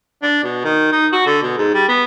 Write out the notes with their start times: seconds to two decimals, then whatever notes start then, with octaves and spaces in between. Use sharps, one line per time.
0.23 D4
0.43 B2
0.64 D#3
0.92 D#4
1.12 F#4
1.26 D3
1.42 B2
1.57 G#2
1.74 G3
1.88 B3